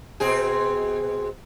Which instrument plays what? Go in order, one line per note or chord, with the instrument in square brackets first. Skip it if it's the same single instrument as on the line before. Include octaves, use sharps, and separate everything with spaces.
[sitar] B2 C4 G#4